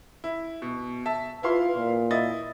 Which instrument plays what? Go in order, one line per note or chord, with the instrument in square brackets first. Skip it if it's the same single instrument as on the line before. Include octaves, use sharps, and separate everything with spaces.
[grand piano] E4
B2
E5 A5
[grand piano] E4 F5 C6 [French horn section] F4 B4
[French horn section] A#2
[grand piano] E4 D#5 A6